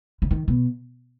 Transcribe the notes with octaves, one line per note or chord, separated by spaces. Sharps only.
D3
D#3
B2